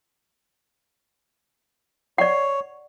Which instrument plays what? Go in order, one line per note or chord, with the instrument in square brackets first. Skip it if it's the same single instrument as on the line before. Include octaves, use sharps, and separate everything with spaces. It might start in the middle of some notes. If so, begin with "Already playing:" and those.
[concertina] C#5 [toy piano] D5 F#5